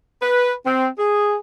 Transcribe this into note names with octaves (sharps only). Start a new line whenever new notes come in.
B4
C4
G#4